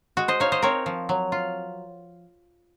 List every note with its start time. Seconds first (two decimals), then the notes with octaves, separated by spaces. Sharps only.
0.17 G#3 F#4
0.28 C5 D#5
0.40 D#4 C#5 F5
0.52 C5 D#5
0.62 C4 A#4 C#5
0.86 F3
1.09 F#3
1.32 F4